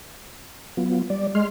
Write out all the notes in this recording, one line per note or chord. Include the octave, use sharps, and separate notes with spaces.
F#3 B3 F4
G3 D5
G#3 G#4 C6 F6